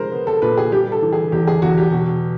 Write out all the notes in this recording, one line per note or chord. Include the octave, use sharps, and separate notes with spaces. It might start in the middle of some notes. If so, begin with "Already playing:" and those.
Already playing: F3 G#3 A#4 C5
B3
A4
A#2 B4
G#4
G3 G4
A4
E3
G#4
E2 G4
G#4
E2 F#4
G4
B2